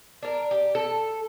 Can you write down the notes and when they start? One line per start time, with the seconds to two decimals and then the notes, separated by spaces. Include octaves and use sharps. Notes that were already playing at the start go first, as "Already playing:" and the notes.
0.23 D4 A#4
0.51 G4
0.75 A4